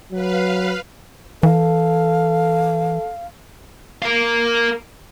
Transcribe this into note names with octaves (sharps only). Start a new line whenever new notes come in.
F#3 B4 F5
E3 A4 F5
A#4 F5